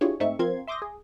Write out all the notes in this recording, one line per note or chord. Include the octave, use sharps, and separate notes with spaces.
D4 E4 F4 G4 G#4 C#5
G#2 A3 C4 D#4 E5 C#6
F3 C4 F4 A#4 C6 G#6
E5 C6 D6 D#6 G6 A#6
G#4